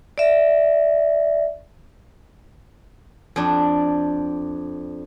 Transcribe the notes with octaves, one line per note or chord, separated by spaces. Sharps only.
D5 E5
F2 D4